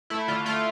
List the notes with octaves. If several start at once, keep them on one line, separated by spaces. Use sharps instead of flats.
A3 E4
D3 F4
A3 F4